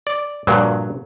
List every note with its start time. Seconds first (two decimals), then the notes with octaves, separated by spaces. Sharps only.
0.07 D5
0.47 G2 A#2 D3 F3 F#3